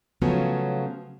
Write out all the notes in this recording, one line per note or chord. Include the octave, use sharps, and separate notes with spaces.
C#3 F3 F#3 A3 B3 C#4